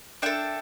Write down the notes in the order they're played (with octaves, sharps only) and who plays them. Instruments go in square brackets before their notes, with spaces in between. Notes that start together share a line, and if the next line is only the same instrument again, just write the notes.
[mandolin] D4 A4 E5 G5